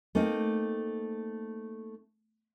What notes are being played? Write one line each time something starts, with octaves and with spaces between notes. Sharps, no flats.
A3 A#3 C4 D#4